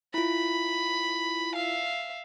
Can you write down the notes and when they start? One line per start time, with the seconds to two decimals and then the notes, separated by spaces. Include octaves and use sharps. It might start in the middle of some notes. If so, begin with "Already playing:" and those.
0.14 E4 F4 B5
1.56 E5 F5